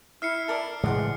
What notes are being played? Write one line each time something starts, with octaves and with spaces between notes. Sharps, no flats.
E4 E5 F6 C7 C#7
A4 A#4 D5
A2 C#3 E3 G#3 D5 F#5 C6